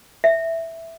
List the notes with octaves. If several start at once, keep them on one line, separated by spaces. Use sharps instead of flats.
E5